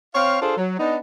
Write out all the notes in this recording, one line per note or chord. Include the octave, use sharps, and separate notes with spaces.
C4 C#5 F5
D4 F4 G#4 A4 C5
F#3
B3 D4 D#4